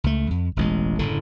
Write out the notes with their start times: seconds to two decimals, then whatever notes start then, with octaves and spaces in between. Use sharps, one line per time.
0.04 C#2 A3
0.31 F2
0.56 E1 A1 G#3
0.99 F#1 A2 D3